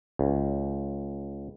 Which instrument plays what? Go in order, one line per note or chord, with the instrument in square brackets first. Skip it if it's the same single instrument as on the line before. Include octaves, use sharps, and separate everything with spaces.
[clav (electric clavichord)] C#2